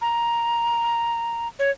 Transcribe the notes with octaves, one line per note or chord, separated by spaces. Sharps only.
A#5
C#5